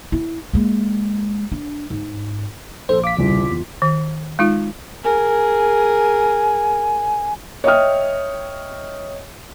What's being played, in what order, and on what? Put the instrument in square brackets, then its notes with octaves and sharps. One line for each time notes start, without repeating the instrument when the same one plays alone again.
[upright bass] E4
G#3 A#3
D4
G#2
[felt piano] A#1 [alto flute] A4 [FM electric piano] C5
[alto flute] F5 [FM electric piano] D6 B6
[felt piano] D#1 C2 C#3 [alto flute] F4
[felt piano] E2
[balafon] D#3
G#3 D#4 F4
[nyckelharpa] G#4 A#4 [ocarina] G#5
[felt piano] C#5 D#5 E5 G5 D#6 F6